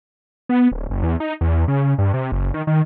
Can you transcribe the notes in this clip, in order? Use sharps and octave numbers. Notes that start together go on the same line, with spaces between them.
B3
D1
F#1
E2
D#4
E2
C#3
G2
C3
F#1
D#3
D#3